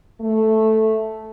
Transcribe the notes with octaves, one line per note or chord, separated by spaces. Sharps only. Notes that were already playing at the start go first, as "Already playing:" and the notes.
A3